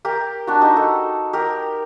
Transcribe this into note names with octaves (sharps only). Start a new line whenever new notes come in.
G4 A#4
D4 F#4
D#4 G4
F#4 A4
G4 A#4